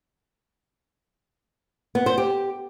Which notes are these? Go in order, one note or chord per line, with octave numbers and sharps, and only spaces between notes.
B3
C5
G4